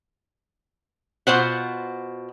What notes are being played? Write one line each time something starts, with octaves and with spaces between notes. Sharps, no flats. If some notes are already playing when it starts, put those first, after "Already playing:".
B2 F4 C5 F#5